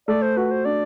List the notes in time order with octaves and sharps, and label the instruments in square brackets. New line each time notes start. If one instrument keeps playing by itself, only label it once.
[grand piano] A3 [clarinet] D5
[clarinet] C5
[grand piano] F#4 [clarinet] B4
[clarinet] C5
[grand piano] D4 [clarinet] D5